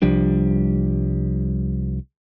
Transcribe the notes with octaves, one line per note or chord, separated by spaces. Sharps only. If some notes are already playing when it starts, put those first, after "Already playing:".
C2 F3 G3 D4